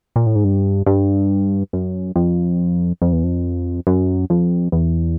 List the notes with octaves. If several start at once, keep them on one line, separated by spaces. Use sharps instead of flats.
A#2
A2
G#2
G2
G2
F#2
F2
F2
E2
F2
F#2
F2
E2